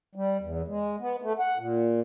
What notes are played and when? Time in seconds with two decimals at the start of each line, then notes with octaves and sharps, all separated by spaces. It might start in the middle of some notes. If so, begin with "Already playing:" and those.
0.15 G3
0.41 E2
0.68 G#3
1.00 B3
1.22 A3
1.39 F#5
1.58 A#2